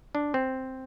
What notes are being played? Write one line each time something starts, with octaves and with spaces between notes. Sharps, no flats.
D4
C4